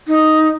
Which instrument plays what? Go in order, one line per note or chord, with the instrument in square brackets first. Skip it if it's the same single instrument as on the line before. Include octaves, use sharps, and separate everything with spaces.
[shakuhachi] D#4